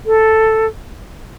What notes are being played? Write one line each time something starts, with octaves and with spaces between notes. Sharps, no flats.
A4